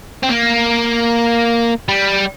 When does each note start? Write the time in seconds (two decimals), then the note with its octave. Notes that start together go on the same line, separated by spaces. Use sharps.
0.23 C4
0.29 A#3
1.89 G3